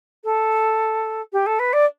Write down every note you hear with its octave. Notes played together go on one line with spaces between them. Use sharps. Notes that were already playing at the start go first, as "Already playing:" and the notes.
A4
G4
A4
B4
D5